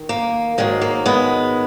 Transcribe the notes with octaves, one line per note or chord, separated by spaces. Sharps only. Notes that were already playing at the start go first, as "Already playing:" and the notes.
Already playing: D#3
A#3
G#2 D#3 F#3 G#3
A#3
G#3 B3